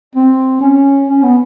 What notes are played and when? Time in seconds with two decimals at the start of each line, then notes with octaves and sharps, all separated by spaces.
0.15 C4
0.61 C#4
1.07 C#4
1.23 B3